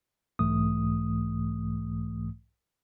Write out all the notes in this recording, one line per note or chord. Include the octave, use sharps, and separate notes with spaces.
B1 G#2 E3 A3 D#6